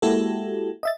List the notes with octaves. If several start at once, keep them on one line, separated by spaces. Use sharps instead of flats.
G#3 A#3 E4 F#4 G4 A4
D#5 E5 A6